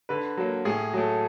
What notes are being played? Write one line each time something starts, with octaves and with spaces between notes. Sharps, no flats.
D3 B4
F#3 A#3
A2 G#4
F#3 A3